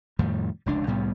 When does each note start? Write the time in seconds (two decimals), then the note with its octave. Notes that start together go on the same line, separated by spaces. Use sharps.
0.19 F2 A2 D#3 G3
0.66 F1 C#2 D4
0.87 C2 A2 G3 B3